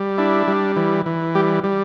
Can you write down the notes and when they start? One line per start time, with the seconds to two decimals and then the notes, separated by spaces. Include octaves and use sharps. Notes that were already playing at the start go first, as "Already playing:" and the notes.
Already playing: G3
0.18 D4 E4
0.48 G3
0.76 E3
1.06 E3
1.35 G3 G4
1.64 G3